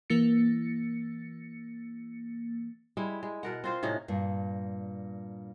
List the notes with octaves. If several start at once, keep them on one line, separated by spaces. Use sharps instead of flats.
E3 A#3 A6 C#7
G3 G#3 E4
G#3
B2 A#4 F#5
C4 F4 C5
A2 C3 C#4 D#4
G2 A#2